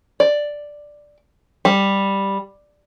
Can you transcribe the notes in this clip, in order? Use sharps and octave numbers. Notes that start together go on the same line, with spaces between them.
D5
G3